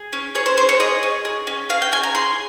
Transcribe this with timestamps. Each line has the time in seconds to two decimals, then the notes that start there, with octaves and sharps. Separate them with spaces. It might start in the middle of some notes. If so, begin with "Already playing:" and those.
Already playing: G#4
0.13 C#4
0.35 G#4 C#5
0.46 C5
0.57 C#4 C5
0.69 C#5
0.80 G#4 D#5
1.03 C#4
1.25 G#4
1.47 C#4
1.69 G#4 F5
1.82 G5
1.92 C#4 G#5
2.03 A#5
2.15 G#4 C6